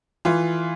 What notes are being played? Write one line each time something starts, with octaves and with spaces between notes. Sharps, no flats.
E3 F4